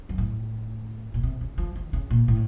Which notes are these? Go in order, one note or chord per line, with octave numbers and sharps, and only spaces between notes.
F#2
A2
A#2
C3
C#3
F3
D#3
C#3
A#2
A2